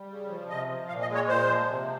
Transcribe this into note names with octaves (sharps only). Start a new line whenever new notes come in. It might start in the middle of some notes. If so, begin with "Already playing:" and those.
Already playing: G3
C#3
F3
C3 D#5
F3
A#2 F5
D#5
G#3
C#5
A#2 C5
F3
C3